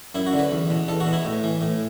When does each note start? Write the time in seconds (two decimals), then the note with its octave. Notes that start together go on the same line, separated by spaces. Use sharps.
0.15 F#2 E4
0.27 F#4
0.33 D3
0.39 B4
0.51 E2
0.70 B2
0.88 E2 A4
1.00 F#4
1.07 B2
1.13 E4
1.25 A2
1.44 E3
1.61 A2